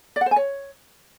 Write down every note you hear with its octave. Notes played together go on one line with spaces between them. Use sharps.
D5
F#5
C5
G#5
C#5